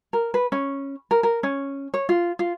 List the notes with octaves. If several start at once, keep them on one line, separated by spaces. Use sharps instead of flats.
A#4
B4
C#4
A#4
A#4
C#4
C#5
F4
F4